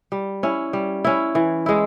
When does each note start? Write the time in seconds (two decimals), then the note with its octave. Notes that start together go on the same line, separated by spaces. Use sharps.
0.12 G3
0.43 C#4 E4
0.73 G3
1.04 C#4 E4
1.35 E3
1.66 G#3 E4